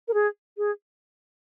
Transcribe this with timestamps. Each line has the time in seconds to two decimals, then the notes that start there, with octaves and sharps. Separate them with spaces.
0.08 A#4
0.14 G#4
0.58 G#4